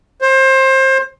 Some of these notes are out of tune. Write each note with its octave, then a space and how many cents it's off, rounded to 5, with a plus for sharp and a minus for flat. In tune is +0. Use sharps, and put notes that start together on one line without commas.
C5 +25